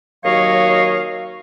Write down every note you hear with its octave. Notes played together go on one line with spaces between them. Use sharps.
D#2 F#3 F#4 C#5 D#5 F5